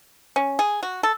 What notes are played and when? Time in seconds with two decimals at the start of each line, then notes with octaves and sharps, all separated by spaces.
0.36 C#4
0.59 G#4
0.83 F#4
1.03 A4